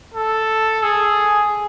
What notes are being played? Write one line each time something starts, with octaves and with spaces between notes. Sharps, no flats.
A4
G#4